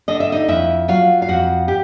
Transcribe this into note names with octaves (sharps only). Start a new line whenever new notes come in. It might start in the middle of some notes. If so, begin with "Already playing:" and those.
D3 D#5
E5
D#4 D#5
F2 E4 E5
F#3 F4 F5
F5
F2 F#4 F#5
G4